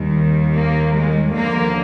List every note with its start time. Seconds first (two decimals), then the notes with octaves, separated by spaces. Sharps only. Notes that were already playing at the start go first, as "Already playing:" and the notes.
Already playing: D#2 D#3 G3
0.55 A#3
0.95 G#3
1.35 D#2 D3 F3 A#3